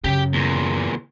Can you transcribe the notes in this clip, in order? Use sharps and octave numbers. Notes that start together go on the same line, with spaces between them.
F#2 C#3 G4 G5
E2 A#2